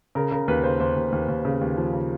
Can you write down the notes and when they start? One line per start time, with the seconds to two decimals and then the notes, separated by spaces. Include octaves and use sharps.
0.15 C#3 A#4
0.32 C#3 A#4
0.48 D#2 B4
0.64 C#3 C5
0.80 D#2 C5
0.96 D#2
1.12 D#2
1.28 D#2
1.45 C#3
1.61 D#2
1.77 F3
1.93 C#3